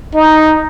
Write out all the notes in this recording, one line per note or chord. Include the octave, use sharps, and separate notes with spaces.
D#4